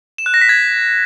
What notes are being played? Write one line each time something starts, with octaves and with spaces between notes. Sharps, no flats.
E7
F#6
A#6
B6
G#6